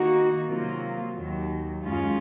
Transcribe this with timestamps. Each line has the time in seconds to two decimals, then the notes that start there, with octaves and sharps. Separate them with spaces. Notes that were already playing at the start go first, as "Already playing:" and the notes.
Already playing: D#3 A#3 D#4 F#4
0.47 C3 F#3 A#3 F4
1.15 D#2 D#3 F#3
1.83 F#2 D#3 G#3 C#4 F4